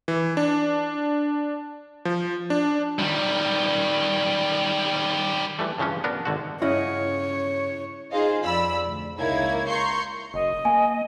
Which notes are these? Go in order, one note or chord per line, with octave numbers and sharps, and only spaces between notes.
E3
D4
F3
D4
D#3 G3
E3 G3 A3
G2 C#3 E3 F3 C#4
B3 D4 A#4
G#1 D3 F#4
G2 C#3 E4 C#5 D#5 F#5
D#4 F4 G#4 C5 D#5 F5
F2 D5 B5 E6
D2
C#2 A#3 D#4 E4 C#5 G#6
A#5 C6 C#6 G6 C7
F#1 D#5
A#3 G#5